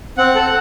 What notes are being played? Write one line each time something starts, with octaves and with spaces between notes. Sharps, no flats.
C4 F#5
A4